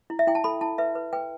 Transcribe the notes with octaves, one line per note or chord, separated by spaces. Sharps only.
E4
E5
E4 G5
A5
A4 B5
E4 A5
B4 E5
B4
B4 G5